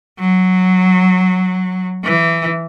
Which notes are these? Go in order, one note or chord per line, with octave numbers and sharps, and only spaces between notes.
F#3
E3